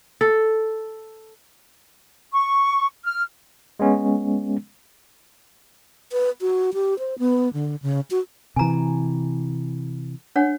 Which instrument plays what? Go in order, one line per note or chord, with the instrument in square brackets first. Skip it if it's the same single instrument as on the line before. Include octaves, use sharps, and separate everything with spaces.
[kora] A4
[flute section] C#6
F6
[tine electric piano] G#3 B3 C#4
[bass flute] B4
F#4
G4
C5
B3
D3
C#3
F#4
[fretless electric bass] C3 E3 [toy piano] G#5 A#5
[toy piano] D4 C#5 F#5